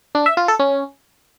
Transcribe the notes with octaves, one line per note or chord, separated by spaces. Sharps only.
D4
E5
F4
A4
C#4